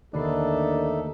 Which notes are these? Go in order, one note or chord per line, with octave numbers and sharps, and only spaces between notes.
D#2 D3 A3 D4 D#4 A4 B5 C7